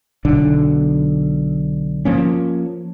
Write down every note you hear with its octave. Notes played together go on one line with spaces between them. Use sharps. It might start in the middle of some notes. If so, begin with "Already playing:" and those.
B1 D3 D4
F3 A#3 C#4